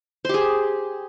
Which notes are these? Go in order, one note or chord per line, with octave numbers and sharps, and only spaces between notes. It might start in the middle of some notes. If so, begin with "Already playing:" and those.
G4 G#4 C5